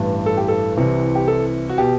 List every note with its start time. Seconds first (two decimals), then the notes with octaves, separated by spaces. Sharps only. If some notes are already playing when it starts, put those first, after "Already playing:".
Already playing: A1 G2 E3
0.26 A4
0.37 G4
0.48 A4
0.77 C2 C3 E3
1.15 G4
1.28 A4
1.69 F#4
1.78 B2 G4